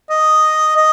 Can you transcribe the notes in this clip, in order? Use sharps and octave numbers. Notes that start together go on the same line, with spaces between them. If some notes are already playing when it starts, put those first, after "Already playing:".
D#5
D#5